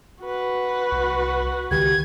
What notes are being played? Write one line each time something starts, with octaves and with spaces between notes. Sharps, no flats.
F#4 B4
C2
C#2 D#3 G4 G#6